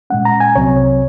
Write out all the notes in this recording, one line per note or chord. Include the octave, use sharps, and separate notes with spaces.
A#2 G#3 C#4 F#5
A#5
G#5
C2 C3 F#3 C4 C#5